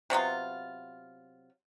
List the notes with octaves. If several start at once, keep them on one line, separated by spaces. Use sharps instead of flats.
C3 F#3 B3 F4